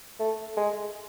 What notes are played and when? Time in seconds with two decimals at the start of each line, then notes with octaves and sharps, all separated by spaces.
0.19 A3
0.57 G#3